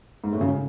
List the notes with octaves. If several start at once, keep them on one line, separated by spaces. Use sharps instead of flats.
G#2
A2
C#3